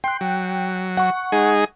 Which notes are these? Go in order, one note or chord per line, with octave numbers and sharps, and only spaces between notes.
G5 C6 F#6
F#3
F#5 C#6
G#3 D#4 G#4